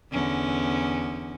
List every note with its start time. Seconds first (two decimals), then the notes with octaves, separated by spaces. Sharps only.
0.11 E2 D3 C#4